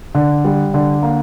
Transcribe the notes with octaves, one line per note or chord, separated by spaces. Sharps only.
D3
G3
D3
A#3